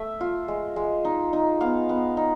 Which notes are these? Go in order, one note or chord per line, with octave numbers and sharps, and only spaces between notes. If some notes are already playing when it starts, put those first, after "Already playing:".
Already playing: A3 E5
F4
G#3
G#3
D#4
D#4
B3 F5
B3
D#4